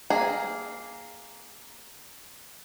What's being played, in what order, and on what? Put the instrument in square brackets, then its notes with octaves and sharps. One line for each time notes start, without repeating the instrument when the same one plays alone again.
[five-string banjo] A#3 G#4